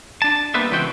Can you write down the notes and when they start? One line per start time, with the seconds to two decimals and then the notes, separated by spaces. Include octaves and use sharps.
0.22 D4 A5
0.54 G3 A#3 B3 B4 C5 E5
0.71 C#2 D3 E3 C4 F#4 G5